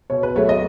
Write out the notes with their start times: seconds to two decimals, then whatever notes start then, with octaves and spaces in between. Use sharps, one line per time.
0.10 B2 C#5
0.23 B4
0.35 F#3 A3 C#5
0.49 D#5